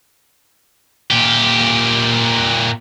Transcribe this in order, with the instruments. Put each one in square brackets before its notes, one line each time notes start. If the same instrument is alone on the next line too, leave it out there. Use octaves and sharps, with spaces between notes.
[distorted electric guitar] A#2 G4